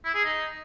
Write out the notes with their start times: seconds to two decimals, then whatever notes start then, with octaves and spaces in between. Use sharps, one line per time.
0.05 E4
0.15 G#4
0.25 D#4